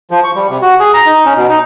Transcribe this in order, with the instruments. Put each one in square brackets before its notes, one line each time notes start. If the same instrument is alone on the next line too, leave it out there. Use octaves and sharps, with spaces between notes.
[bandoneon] F3
C#6
G3
C3
F#4
G#4
A#5
D#4
C#4
B2
D#4